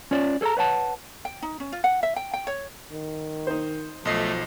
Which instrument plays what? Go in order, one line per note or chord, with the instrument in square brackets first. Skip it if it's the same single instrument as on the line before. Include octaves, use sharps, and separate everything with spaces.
[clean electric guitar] C#4 F4 C#5 D5
G#4 A4 C5 A5 A#5
B4 C#5 F#5 A5
[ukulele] G5
D#4
C#4
F4
F#5
E5
G5
G5
C#5
[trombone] D#3
[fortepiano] D#4 C5
[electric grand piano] B1 D#5 C7 [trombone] F3 [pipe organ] A3